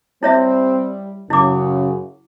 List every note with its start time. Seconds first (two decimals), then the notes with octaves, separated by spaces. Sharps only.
0.23 G3 C4 E4 C#5 E5
1.30 F#2 C#3 E4 D6